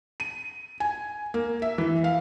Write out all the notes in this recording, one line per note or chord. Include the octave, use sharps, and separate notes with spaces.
D#7
G#5
A#3
E5
E3
F5